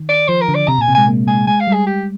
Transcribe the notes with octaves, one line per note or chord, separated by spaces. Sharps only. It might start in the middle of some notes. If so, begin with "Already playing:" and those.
Already playing: D#3
D5
F3 C5
A#4
D3
D5
C3 A#5
A#2 G#5
C3
G#3 G#5
A#3
G#3 G#5
G#3 G#5
F5
G3
G#4
G4